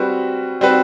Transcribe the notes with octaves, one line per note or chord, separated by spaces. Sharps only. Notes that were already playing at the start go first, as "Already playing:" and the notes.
Already playing: G3 C4 F#4 B4
G3 C4 F#4 B4